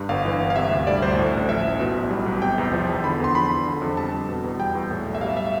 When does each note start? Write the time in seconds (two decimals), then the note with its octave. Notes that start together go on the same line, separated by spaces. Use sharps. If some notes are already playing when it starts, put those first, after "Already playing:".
Already playing: G2
0.09 G1 F5
0.25 E3
0.40 G1
0.50 F5
0.56 C3 E5
0.71 D2
0.87 G3 D5
1.02 D2 C5
1.17 A2
1.33 A1
1.48 F3 E5
1.64 A1
1.80 B2
1.95 B1
2.11 G3
2.26 B1
2.42 C3 G5
2.58 E2
2.73 F3
2.89 E2
3.04 D3 B5
3.20 E2 C6
3.35 F3 B5
3.51 E2
3.67 D3
3.82 F2
3.97 G3 A5
4.13 F2
4.29 B2
4.44 E2
4.59 G3 G5
4.75 E2
4.91 A2
5.06 B1
5.15 E5
5.21 G3 F5
5.37 E5